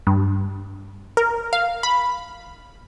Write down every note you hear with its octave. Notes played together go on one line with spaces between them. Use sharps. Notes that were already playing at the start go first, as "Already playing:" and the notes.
G2
A#4
F5
B5